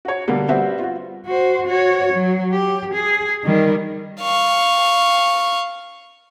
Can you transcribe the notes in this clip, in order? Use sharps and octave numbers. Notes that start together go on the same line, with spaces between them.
F#4 C#5
B2 D3 G3 A#3
G3 B3 C4 F#4 C5 E5
F4 F#4
F#4 C5
F#4 C#5
F#3
G4
G#4
D#3 G3
F5 C#6